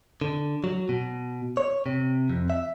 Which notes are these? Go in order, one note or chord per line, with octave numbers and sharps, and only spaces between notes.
D3
F#3
B2
C#5
C3
F2
E5